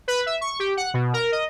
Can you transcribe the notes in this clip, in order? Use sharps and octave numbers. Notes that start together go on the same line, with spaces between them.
B4
E5
C#6
G4
F#5
B2
A#4
D#5